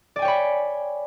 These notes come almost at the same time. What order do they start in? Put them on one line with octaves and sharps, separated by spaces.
D5 G#5 G5 C#5 B5